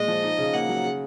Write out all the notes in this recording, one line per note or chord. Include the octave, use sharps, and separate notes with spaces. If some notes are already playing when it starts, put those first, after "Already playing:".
Already playing: A#2 G#3 D#5
F3
D#4
C#3
A#3 F#5
F#3
C#3